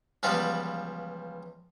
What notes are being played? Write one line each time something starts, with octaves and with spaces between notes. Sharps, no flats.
C#2 E3 F3 G3 B3